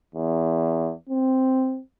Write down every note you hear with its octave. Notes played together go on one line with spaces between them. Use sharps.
E2
C4